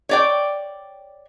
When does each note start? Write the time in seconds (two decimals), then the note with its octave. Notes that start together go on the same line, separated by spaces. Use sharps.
0.09 C#5 D5 G5